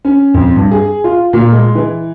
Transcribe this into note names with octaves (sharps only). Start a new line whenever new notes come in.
C#4
F2
G2
G#4
F4
A#2
G#3
E3